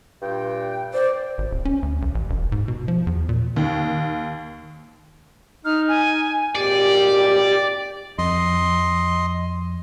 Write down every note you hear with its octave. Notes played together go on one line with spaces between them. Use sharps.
G2 A#2 G5
C5 D5
G#1
D1
C#4
D2
B1
A1
E1
G#2
B2
F3
E2
A#2
D#2
D#4 F6
G#5
G#1 A#2 G4 D5
F2 D#5 C6